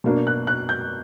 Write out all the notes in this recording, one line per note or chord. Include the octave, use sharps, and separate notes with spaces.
B2 A#3 D4
F#6
F#6
G6